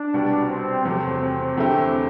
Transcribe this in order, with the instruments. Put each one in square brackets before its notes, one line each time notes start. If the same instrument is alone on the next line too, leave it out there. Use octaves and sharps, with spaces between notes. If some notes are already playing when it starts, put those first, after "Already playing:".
Already playing: [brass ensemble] D4
[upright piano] C2 B2 G3
[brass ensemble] C4
[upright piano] E2 C3 F#3 A3 [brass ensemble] C4
[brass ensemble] C4
[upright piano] E2 D3 A3 E4 G4 [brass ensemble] C4